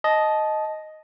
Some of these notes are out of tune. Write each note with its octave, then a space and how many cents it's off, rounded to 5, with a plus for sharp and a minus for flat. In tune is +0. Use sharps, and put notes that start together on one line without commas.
D#5 +0 A5 -20